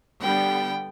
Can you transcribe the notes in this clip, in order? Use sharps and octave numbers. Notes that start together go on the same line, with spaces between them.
D3 G3 B3 G5